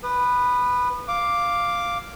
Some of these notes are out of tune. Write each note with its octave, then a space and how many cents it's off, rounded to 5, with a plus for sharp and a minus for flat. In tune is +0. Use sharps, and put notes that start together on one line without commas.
B4 +0 D#6 -35
F5 +0 D6 +0